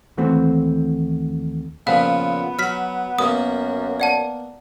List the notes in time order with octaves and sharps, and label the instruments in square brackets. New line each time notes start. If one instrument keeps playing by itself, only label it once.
[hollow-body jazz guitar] D#2 E3 A3 C4 F#4
[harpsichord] A#2 C#3 F3 [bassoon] B3 [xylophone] F5
[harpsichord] F#3 [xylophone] F6 B6
[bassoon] F#2 [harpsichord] A#3 B3 [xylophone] D#6
[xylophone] D5 F#5 A5